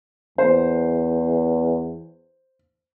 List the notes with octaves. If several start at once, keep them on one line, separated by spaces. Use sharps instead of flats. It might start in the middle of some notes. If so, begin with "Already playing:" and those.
E2 C5